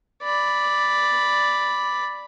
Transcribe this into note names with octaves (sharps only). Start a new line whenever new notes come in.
D5 B5